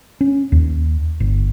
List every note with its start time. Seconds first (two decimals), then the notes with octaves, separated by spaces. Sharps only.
0.21 C#4
0.52 D#2
1.20 G1